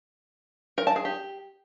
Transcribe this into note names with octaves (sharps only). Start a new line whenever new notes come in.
A#4
A5
G#4
G4